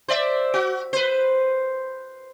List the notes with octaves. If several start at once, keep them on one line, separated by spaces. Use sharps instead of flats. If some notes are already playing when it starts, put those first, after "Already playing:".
C5 D5 E5
F#4
B4 C5